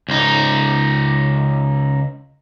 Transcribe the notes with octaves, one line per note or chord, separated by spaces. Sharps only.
C#2 D#4